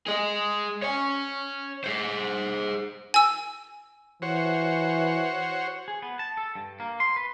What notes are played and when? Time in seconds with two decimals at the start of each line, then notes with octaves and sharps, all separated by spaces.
0.07 G#4 D#5
0.82 C#5 G#5
1.84 G#4 C5
3.14 G#5 E6
4.22 E3 F#4 C5 C#5
5.88 G#4
6.02 B3
6.19 A5
6.37 A4
6.55 G2
6.80 A#3
7.00 C6
7.16 B4